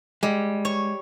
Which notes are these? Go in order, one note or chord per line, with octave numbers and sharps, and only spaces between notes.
G3 G#3
C#5